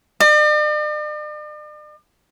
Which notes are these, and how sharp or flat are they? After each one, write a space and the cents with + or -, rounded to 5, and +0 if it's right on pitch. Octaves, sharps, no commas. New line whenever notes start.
D5 +45